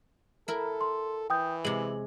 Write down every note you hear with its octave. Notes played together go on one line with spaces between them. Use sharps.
E4 A4 A#4
C6
E3 G5 D#6 G6
C3 G#3 F#7